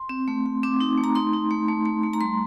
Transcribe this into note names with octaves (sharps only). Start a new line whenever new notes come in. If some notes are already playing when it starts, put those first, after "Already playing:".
Already playing: C6
C4
A3
A3
C4 D6
D#4
A3
A#5
D#4 C6
D#4
A3
A3
A3
A3
A#5
G3 C6